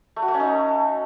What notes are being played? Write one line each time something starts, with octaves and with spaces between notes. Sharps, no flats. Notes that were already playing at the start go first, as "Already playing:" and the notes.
A3
F#4
A3
C#4
D#4